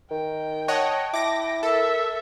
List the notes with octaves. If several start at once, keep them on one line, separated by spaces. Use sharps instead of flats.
D#3 G5
C#5 D#5 F#5 A5
E4 D6 A#6
A4 A#4 E5